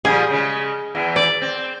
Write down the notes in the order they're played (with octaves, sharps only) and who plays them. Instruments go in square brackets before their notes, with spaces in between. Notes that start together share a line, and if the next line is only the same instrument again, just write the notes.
[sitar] A#2 F3 G3 [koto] G#4
[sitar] C#3 G#3
E2 E3
[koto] D5
[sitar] C4